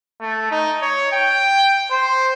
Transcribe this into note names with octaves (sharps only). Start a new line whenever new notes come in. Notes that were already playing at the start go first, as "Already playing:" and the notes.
A3
D#4
C#5
G5
C5